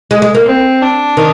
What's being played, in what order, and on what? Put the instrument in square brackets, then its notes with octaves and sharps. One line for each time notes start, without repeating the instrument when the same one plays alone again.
[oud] G#3
G#3
A#3
[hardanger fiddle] C4
D4
[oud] D#3